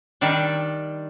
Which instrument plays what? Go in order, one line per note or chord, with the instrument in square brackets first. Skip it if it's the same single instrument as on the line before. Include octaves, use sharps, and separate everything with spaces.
[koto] D#3 G3 D4